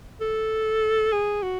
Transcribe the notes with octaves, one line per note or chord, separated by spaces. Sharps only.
A4
G#4
F#4